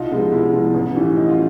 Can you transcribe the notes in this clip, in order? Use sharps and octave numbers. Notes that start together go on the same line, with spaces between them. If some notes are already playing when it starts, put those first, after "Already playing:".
Already playing: C2 D#4 F4
C3 F3 G#3 B3
C2 E4
C3 F3 G#3 B3
A1
A2 E3 G3
A1 D#4
F4